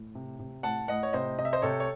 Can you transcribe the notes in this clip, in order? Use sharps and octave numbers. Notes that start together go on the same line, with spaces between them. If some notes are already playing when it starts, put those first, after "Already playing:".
Already playing: A2
C3
C3
A2 F#5 A5
A2 D#5 F#5
C#5
C3 C5 D#5
C3 D#5
E5
C5 D#5
C3 A4 C#5
C#5